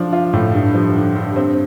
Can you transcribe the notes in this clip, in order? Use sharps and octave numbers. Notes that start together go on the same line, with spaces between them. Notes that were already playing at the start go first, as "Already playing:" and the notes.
Already playing: F3 D4
F4
A2
G2
F3
D3
G2
C4